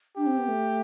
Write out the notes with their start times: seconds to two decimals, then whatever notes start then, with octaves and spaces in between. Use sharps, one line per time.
0.17 D4 G4
0.27 C4
0.38 B3
0.48 A3